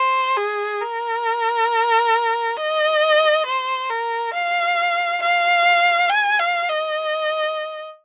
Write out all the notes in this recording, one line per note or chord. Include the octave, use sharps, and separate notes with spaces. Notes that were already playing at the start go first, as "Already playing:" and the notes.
Already playing: C5
G#4
A#4
D#5
C5
A#4
F5
F5
G#5
F5
D#5